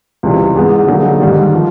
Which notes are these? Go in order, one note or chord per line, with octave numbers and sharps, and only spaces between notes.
C#2 C3 E3 G3 C4
G#2 E3 G#3 B3
D3 F#3 A#3 D#4 G#4
G#2 D#3 G3
F3